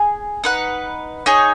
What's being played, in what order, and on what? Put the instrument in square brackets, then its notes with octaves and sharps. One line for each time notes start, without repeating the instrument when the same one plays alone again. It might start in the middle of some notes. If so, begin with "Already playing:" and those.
Already playing: [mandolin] G#4 G#5
D#4 B4 F#5
D#4 G#4 C#5